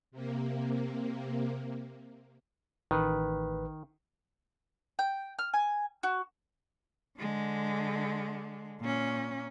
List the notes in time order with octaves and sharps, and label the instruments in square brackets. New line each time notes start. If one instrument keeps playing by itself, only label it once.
[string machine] C3 A#3
[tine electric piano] A1 B4 [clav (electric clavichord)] D#3
[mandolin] G5
F6
G#5
F#4
[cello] D3 G#3
A#2 C#4